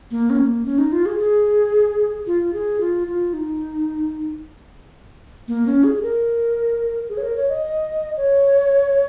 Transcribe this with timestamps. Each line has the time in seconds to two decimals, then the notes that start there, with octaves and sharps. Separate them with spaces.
0.11 A#3
0.30 C#4
0.39 A#3
0.65 C#4
0.78 D#4
0.92 F4
1.06 G#4
1.19 G#4
2.27 F4
2.53 G#4
2.81 F4
3.07 F4
3.33 D#4
5.48 A#3
5.66 C#4
5.84 G#4
5.95 G#4
6.03 A#4
7.09 G#4
7.17 C#5
7.23 A#4
7.36 C#5
7.50 D#5
8.17 C#5